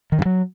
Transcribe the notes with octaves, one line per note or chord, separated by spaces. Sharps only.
D#3
G2
F#3